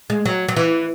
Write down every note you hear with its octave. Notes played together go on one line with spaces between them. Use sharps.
G#3
F#3
F#3
E3